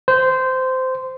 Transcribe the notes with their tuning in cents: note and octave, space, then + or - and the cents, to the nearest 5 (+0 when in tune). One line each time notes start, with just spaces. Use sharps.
C5 -15